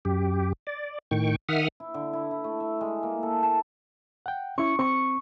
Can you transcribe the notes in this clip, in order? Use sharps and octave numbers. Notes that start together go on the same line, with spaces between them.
F#2 G4
D5
A2 D#3 G5 C#6
D#3 E5 F#5 D#6 F6
E4
D3
E4
E4
A3
E5
G#3
A#3
A4
A5
F#5 G5
C#4 E4 C#6
C4 C#6